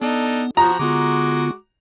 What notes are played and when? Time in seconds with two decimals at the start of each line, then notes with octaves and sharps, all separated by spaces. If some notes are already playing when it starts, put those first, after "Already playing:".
0.02 B3 D4 D#4 A4
0.57 F3 F4 F#4 A#5 D#6
0.79 D3 G#3 B3 F4 F#4 D6